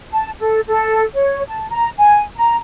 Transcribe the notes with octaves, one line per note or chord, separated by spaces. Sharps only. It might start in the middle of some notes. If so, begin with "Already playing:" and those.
A5
A4
A4
C#5
A5
A#5
G#5
A#5